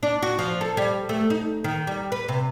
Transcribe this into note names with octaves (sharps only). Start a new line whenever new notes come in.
D4
F#4
F3
A4
G3
A3
D#4
D#3
G3
B4
C3